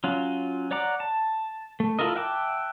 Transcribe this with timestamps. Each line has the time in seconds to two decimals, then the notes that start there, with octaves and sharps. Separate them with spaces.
0.04 F#3 C#4 F4
0.71 C#5 D5 F#5 A#5 D6
1.00 A5
1.80 A3
1.99 E4 F4 A4 A#4 D#5
2.16 E5 F#5 G5 A5 D6